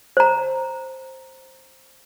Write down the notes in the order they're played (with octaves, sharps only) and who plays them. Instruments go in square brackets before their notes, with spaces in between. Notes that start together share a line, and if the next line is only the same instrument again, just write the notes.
[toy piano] C5 A#5